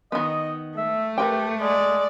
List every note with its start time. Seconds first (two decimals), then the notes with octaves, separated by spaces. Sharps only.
0.12 D#3 B3 D#5
0.77 A3 E5
1.18 G4 A#4 B4 G5
1.61 G#3 D5